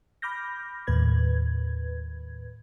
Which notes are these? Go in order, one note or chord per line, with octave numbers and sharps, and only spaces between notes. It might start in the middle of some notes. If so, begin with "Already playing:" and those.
B5 D6 F6 G6 A#6
D#2 A2 B4 G#6